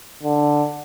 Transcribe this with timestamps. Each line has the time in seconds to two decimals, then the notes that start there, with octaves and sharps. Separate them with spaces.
0.23 D3